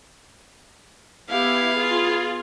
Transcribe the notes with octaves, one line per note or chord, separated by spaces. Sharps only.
B3 E4 G4 F5
F4 G#4